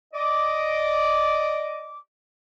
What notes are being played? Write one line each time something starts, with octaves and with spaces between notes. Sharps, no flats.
D5 D#5 D6